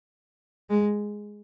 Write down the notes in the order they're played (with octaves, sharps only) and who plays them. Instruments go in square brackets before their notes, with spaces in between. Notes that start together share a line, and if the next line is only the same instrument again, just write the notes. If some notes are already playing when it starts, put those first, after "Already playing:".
[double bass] G#3